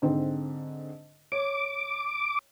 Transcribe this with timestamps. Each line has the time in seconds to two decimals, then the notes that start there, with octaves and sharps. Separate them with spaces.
0.02 G#2 D3 C4
1.32 C#5 D6